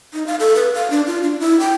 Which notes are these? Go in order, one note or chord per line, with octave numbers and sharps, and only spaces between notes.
D#4
F5
A4
B4
F5
D4
F4
D4
E4
G5